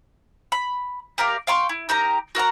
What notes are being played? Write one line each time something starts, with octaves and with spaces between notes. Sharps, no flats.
B5
G4 A#4 D5 F5
F5 G5 C6 C#6
E4
D#4 G4 A#4 A#5
F#4 A#4 F#5 A#5